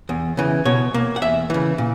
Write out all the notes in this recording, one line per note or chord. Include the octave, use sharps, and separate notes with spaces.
E2
C#3 E3
B2 C#5
A#3
F#5
E2 E5
C#3 E3
A#2